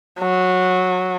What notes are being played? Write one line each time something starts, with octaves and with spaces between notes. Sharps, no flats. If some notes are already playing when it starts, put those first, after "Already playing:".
F#3